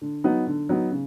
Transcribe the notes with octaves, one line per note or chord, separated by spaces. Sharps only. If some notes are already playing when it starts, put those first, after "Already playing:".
D3
F#3 B3 D#4
D3
F#3 B3 D#4
C#3